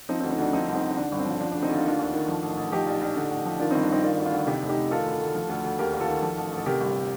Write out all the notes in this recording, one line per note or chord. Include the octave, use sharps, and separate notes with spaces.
F3 C4 D#4
C4 D#4
D2
C4 D#4
D2 D4
F3 C4 D#4
C2
C4 D#4
C2
D#4
D3 D4
G1
C4
F3
F3 D4
D2 D4
C4 D#4
D2 F4
D#4
D#2 D4 F4
D#2
D#3
F3
A1
A1
F3 D#4 G4
A#1
A#1
D3
A1
F3
D#3 D4 F4
G1 C4 D#4
D4
G1 C4 D#4
D#3 D4 F4
D2
D4 F4
D2
C3 D#4 G4
F1
D#4 G4
F1
D#3 F4 A4
D2
D2
F3
D2
D2
D#2 G4 A#4
D#2 A#4
F4 A4
D#3
F3
A1
A1
A4
C3 G4 A#4
G1